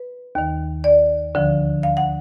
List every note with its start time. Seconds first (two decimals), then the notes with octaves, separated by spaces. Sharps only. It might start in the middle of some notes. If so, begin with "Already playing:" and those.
Already playing: B4
0.35 D#2 D#3
0.84 D5
1.35 D2 D3 F3
1.83 F5
1.97 F#5